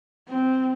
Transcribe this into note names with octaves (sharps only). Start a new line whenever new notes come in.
C4